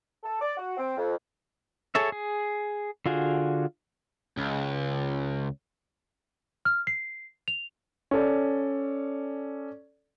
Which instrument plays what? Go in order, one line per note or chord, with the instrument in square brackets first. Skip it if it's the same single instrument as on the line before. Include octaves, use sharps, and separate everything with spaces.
[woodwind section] A4
D5
F#4
C4
F2
[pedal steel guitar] G#4 A4 C#5 E5
G#4
D3 F4 F#4 G#4
[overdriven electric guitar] C#2
[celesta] F6
C7
F7
[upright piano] C#4 A4 D5